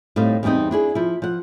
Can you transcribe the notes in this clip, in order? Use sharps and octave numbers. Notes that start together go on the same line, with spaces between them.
A2 G3 C4 D#4 F5
E2 G3 B3 C4 D#4
D4 E4 G#4
F3 E4
F3 F#5